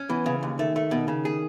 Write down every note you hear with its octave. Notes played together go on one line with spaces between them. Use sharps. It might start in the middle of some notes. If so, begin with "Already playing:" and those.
Already playing: C#4
E3 B3
C#3
D#2
D#3 A3
A3
B2
C#3
G#4